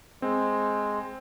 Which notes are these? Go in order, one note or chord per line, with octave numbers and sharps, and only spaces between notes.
G#3 C4